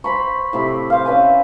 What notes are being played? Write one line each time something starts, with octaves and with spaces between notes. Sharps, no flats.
C5 B5 C#6
A2 C3 B5
C5 F5
C#4 B4 E5 G#5